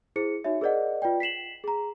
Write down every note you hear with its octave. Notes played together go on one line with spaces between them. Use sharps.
E4 G#4 C5 C#7
D#4 F#4 C#5 E5
G#4 A#4 C5 D5 D#5 F#5
F4 B4 D5 G5
B6 C7 E7 F#7
G#4 A#5